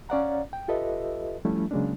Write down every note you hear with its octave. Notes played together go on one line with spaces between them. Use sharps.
C#4 C#5 D5 F5 F#5 A#5
G5
F4 G4 A4 B4 D#5 E5
F3 G3 A3 C#4 E4
C#3 F#3 G#3 A#3 C#4 D4